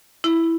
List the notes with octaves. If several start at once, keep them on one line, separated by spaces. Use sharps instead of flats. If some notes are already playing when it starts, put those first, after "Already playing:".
E4